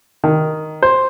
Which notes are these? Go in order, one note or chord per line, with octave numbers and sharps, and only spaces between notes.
D#3
C5